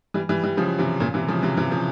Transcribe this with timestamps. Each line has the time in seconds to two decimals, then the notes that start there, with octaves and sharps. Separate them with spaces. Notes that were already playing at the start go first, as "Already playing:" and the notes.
0.14 E3 G3
0.29 E3 G3
0.44 E3 G3
0.57 C#3 F3
0.79 C3 E3
1.00 A#2 C#3
1.14 C3 E3
1.28 C#3 F3
1.42 C3 E3
1.57 C3 E3
1.71 C#3 F3